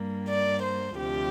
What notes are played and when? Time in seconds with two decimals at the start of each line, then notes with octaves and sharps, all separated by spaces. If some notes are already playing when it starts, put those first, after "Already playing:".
Already playing: G2 G3 A#3
0.29 D5
0.63 C5
0.98 D2 C3 F3 G4